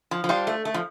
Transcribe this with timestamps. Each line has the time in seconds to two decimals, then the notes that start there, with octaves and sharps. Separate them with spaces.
0.11 F3
0.24 F3
0.29 G3 D4 F4 C5
0.47 A3
0.65 A3
0.74 F3